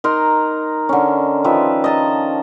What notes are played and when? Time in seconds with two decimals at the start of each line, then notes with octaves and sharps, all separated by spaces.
0.04 D#4 A#4 A#5 C6
0.89 D3 C#4
1.44 D#3 F3 B4 E5
1.84 D#5 A5 A#5